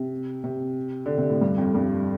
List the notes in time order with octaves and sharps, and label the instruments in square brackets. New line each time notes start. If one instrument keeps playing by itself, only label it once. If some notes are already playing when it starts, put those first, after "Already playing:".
Already playing: [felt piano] C3
C3
D3
C3
A2
G2
F2
G2